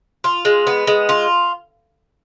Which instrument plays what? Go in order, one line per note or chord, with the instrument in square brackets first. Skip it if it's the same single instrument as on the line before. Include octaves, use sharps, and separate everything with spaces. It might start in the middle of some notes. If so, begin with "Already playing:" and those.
[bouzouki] F4
G#3
B3
G#3
F4